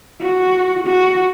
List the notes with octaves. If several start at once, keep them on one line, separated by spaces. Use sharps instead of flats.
F#4
F#4